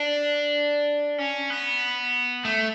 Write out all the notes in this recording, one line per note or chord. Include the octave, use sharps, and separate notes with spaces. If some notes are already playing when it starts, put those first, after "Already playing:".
Already playing: D4
C#4
B3
A3